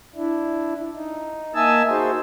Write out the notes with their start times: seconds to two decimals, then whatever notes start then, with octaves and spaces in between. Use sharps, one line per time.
0.16 D4 E4
0.95 D#4
1.55 A#3 D#5 E5 G#5 A5 E6
1.89 D#4 F#4 G#4 C5